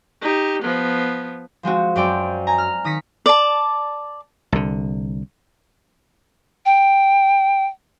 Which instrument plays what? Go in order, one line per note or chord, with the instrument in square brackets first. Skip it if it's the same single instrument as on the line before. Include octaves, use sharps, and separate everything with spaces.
[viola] D#4 G4
F3 B3
[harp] F3 G#3 C4 F#4
F#2 C4 D5 G5
G#5 A#5
F6
D#3 D#6 A#6 B6 C#7
[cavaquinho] D5 A5
[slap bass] C2 D3
[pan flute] G5